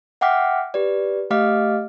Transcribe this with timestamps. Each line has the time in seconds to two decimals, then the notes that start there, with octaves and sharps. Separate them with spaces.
0.21 E5 F#5 G5 D6 F6 B6
0.74 G4 B4 D5
1.30 A3 G4 D#5 F5 D6 F6